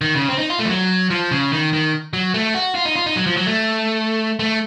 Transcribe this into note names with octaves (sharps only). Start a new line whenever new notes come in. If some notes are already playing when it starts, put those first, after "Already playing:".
D#3
C#3
C4
D#4
F4
A3
F3
F#3
F3
C#3
D#3
D#3
F#3
A3
F#4
F4
D#4
F4
D#4
F#3
F3
F#3
A3
A3